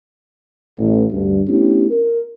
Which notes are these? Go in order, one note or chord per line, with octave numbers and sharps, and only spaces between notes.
A1
D2 G2
A3 B3 C#4 D4 E4 G4
A#4